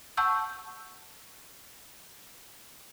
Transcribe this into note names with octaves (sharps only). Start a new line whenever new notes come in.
F#5 A5 C#6 E6 G6